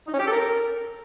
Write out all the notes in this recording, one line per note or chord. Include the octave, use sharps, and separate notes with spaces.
D#4
C#4
G4
A4
A#4